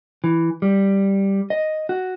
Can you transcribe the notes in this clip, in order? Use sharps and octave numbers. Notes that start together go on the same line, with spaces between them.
E3
G3
D#5
F#4